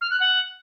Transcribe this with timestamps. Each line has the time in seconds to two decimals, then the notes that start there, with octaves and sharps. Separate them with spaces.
0.01 F6
0.11 F#6
0.20 F#5